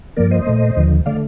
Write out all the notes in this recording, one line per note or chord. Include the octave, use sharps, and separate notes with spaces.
G2 F3 A#3 A#4 D5
C5 D#5
A#2 A3
D#2 D3 F3
D3 A3 D5 F5